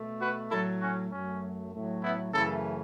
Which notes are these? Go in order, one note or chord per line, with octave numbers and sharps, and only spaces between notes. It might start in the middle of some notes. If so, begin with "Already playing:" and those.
Already playing: B2 A3
F#4 B4
A2 F#3 A3 E4 A4
C#4 F#4
F#2 F#3 A3 C#4
A2 F#3 A3
B3 E4
F#2 C#3 E3 A3 E4 A4